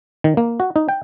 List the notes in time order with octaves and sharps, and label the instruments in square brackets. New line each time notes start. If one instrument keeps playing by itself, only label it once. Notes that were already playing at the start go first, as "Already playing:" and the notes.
[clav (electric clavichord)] D#3
A#3
F#4
D#4
G5